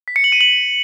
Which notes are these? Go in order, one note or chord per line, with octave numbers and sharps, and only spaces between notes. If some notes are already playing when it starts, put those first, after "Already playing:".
B6
C#7
F#7
D#7
F#7